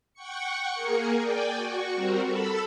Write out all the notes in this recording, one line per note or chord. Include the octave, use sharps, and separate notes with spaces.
F#5 G5 C#6 C#7
A#3 G#4 A#4
D5 G5 G#5
F#4 C#6
G3 C4 F#4 A#4
A4 B5 E6